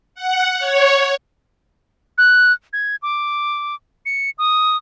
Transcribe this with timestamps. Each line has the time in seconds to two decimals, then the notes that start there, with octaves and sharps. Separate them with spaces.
0.15 F#5
0.59 C#5
2.18 F#6
2.73 G#6
3.02 D6
4.06 C#7
4.38 D#6